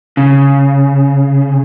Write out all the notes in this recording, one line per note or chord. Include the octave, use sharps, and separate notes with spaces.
C#3